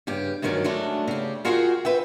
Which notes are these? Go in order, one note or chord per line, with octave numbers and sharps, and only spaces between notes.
G2 C#3 G4
D2 G2 D#3 F#3 C#4
F#3 G#3 A3 C#4 D4
C#3 G4
F4 F#4 G#4 A#4 F#5 G5
B4 E5 G5